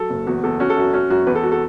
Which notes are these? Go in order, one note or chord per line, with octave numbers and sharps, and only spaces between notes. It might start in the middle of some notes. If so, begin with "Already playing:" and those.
Already playing: F#3 A4
F#1
E2 F#4
E2 A4
C#4 F#4
A4
F#2 F#4
C#4 F#4
F#2 F#4
E2 B4
A4
F#4
A4